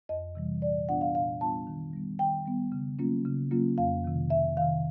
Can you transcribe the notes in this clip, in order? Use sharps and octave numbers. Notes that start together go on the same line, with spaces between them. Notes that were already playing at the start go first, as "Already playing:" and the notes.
F2 D#5
C3 E3 G3
A#2 D5
G3 B3 D4 F4 F#5
F5
A#2 F5
G3 B3 D4 F4 A5
D#3
G3 B3
D#3 G5
G3 B3
C#3
F#3 A#3 C#4 F4
C#3
F#3 A#3 C#4 F4
F2 F5
C3 D#3
F2 E5
C3 D#3 F5